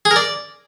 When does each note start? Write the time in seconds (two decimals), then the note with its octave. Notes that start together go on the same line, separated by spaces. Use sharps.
0.05 G#4
0.11 A#4
0.16 D5